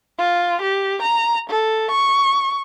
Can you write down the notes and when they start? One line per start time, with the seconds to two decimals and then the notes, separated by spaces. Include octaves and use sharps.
0.18 F4
0.62 G4
1.02 A#5
1.50 A4
1.91 C#6